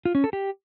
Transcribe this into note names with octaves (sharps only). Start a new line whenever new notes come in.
F4
C#4
A4
G4